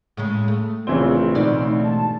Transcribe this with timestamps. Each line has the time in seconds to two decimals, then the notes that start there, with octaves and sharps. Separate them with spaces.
0.17 A2 C#3 G#3
0.48 A3
0.87 A#1 C#3 E3 C4
1.35 D2 B2 D#4 D5
1.84 G#1 A5